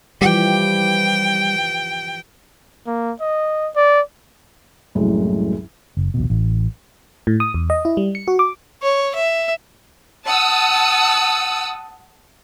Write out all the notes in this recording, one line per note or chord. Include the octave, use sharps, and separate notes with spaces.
E3 F3 G3 G4 G5
A#3
D#5
D5
C2 F#2 A2 F#3 G#3
F#1
A#1 D#2 B2
A1
A2
D#6
E2
D#5
E4
G3
C#7
F#4
D6
C#5
E5
F#5 A5 D#6 E6